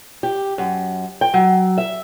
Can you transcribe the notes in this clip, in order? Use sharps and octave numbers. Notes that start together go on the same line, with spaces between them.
G4
F#2
G5
F#3
E5